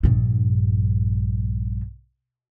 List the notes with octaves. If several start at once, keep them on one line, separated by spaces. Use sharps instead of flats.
A#1 G2